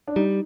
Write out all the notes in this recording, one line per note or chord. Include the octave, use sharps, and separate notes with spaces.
D4
G3 D#4